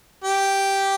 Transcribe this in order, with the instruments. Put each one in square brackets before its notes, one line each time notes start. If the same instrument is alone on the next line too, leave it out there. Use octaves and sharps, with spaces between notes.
[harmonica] G4